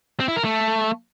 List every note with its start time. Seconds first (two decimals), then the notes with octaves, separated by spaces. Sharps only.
0.20 C4
0.28 E4
0.36 A#4
0.44 A3